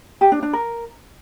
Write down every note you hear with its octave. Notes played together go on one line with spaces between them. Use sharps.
G4
D4
D4
A#4